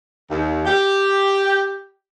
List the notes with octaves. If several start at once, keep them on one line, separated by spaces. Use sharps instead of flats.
D#2
G4